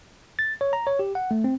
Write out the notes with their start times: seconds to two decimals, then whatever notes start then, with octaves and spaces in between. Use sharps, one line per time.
0.39 A6
0.61 C#5
0.73 A#5
0.87 C#5
0.99 G4
1.15 F#5
1.31 A3
1.44 C4